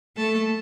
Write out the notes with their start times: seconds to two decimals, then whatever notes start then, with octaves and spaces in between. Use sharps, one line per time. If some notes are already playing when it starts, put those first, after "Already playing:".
0.16 A3 A4